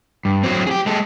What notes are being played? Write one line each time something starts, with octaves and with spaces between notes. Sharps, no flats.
G2
F#3 C4
G4 G#4
G#3 A4